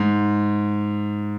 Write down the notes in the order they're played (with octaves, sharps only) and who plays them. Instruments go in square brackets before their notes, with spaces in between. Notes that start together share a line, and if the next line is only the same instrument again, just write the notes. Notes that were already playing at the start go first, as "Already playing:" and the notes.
Already playing: [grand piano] G#2